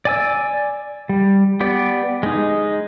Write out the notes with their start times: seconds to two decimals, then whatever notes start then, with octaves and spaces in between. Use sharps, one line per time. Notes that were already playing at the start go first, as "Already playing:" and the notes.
0.05 D5 G#5 E6
1.09 G3
1.60 B3 G4 D5
2.23 G#3 D#4